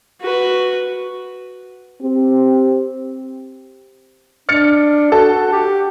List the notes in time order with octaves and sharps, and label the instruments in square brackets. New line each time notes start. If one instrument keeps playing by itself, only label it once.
[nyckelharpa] F#4 B4
[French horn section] C4 G4
[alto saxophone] D4 [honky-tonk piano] F6 A6 C#7
[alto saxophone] F#4 [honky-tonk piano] A4
[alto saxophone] G4